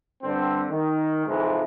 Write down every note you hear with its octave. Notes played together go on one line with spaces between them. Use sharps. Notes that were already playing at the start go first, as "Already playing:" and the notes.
G2 D3 C4
D#3
F2 G#2 C3 E3 F3 G#3